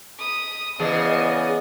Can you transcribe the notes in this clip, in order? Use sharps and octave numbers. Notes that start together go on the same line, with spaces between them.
B5 D#6
C#3 E3 B3 G#4 D5 D#5 G#5